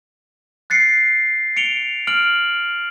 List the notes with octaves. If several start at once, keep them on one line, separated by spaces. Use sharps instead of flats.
F#6 A6 C7 C#7
C#7 D7 F7 G7
F6 D7 F#7